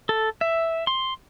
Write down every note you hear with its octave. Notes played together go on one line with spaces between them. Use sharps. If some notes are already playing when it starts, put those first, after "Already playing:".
A4
E5
C6